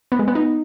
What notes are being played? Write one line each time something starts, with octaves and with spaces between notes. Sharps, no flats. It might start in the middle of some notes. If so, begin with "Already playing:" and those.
B3
G#3
B3
D#4